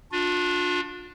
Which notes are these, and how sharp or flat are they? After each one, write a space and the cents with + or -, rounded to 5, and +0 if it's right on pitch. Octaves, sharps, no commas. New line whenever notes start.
D4 +0 F4 +35